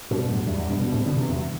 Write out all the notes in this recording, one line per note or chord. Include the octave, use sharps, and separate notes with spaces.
G2 B2
F#2 A2
E2 G2
E2 G2
G2 B2
G2 B2
A2 C3
B2 D3
C3 E3
E2 G2